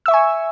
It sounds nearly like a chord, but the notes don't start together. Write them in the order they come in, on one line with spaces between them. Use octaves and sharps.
E6 E5 C#6 G#5